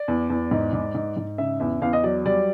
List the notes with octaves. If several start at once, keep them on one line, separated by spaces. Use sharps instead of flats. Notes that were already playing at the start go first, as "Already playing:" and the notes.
Already playing: D5
E2
E2
G#2
G#2
G#2
G#2
C#3 E5
E2 E5
E2 F5
D#5
F#3 D5
G3 D5